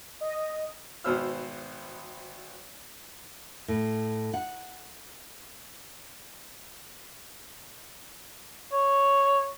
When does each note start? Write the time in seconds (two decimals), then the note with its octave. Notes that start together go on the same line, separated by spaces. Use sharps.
0.21 D#5
1.04 G#1 B2 B3 C5 E6 F6
3.68 A2
4.34 F#5
8.73 C#5